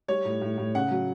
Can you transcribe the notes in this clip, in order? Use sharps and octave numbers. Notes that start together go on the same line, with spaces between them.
G3 C#5
A2
A2
A2
C#3 F#5
F#3